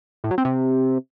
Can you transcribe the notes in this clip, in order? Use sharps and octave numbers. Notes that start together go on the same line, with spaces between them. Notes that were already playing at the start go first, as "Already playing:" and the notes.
A2
F#3
C4
C3